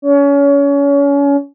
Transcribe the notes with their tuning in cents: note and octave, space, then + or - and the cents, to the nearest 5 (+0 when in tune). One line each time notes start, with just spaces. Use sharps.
C#4 +30